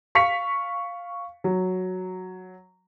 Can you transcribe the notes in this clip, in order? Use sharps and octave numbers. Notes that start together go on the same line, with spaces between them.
F5 C#6 B6 C#7 F7
F#3